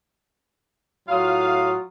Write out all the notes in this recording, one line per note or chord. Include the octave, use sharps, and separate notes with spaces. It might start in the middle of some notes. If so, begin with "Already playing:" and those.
A2 F#3 F4 F5 C6 D#6